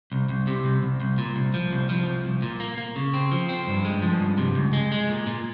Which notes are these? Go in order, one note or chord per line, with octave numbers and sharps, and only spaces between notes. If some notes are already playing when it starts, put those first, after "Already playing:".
C2
C2
C3
C2
C2
C2
A#2
C2
F3
C2
F3
C2
C2
A#2
A#3
A#3
C#3
C4
F3
C4
G2
G#3
F3
G2
C3
C#2
G#3
G#3
A#2
A#2